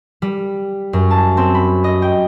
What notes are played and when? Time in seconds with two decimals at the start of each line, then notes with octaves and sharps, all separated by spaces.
0.22 G3
0.93 F#2
1.11 A5
1.37 C4
1.55 B5
1.84 D#5
2.02 G5